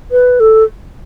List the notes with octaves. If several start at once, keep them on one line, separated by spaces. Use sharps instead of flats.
B4
A4